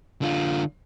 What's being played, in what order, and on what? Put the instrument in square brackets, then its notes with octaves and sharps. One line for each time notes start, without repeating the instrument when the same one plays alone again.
[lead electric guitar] D3 F4